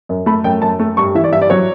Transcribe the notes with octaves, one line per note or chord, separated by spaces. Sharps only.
F#2
A3 B5
F#2 G5
F#2 A5
A3
G2 C#6
E3 E5
D5
G2 E5
D5
F#3 C#5